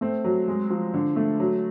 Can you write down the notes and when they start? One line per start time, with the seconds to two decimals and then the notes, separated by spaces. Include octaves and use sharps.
0.01 A3 C4
0.24 F#3
0.48 G#3
0.70 F3
0.94 D3
1.16 A3
1.40 F#3